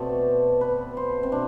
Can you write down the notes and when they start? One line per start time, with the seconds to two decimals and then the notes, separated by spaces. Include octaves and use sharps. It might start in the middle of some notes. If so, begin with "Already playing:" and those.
Already playing: B2 A3 C4 A4 D5 E5
0.61 B4
0.97 C5
1.23 C4
1.32 B2 D4